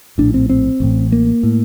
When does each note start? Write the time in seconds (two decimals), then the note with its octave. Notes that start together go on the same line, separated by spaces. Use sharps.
0.18 A#1 A2 D4
0.34 C4
0.50 C4
0.80 A1 A2
1.12 A#3
1.43 A2